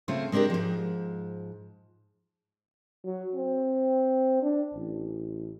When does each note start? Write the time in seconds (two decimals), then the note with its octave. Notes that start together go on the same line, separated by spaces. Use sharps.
0.08 C#3 A3 C4 F4 C5 C#5
0.32 G#3 C4 D4 G4 A#4
0.50 G#2 F3
3.04 F#3
3.36 C4
4.42 D4
4.74 A1